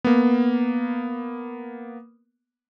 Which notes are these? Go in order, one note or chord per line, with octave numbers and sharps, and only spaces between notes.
A#3 B3